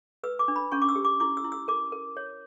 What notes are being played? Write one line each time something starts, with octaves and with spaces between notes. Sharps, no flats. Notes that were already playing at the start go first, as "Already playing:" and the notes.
B4 E6
D6
D4
B5
C#4 C#6
D6
E6
G4
D6
E4 D6
E6
E4
E6
A#4 D6
A#4
C#5